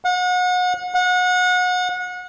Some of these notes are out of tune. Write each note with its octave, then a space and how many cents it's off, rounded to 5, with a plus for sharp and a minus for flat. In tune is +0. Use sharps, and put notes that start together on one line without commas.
F#5 -35
F#5 -30